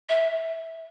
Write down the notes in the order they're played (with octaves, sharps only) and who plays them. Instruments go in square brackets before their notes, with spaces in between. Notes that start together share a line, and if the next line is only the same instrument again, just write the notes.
[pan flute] E5